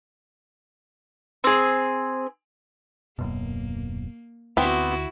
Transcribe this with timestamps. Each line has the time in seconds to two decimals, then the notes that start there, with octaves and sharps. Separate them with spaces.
1.44 C4 G#4
3.19 D#1 F#2 B2 A#3
4.57 D2 B3 C4 E4 F#4